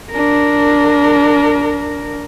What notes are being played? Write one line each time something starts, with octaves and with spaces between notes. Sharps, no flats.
D4 A#4